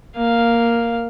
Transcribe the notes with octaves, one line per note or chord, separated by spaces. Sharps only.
A#3 F5